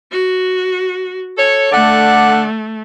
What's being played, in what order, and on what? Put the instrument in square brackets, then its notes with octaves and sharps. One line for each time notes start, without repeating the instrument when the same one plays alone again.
[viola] F#4
[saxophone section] A4 C#5
[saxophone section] D3 D5 F#5 [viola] A3